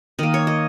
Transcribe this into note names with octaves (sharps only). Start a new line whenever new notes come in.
D#3 A#3 D#5
C#5
D#5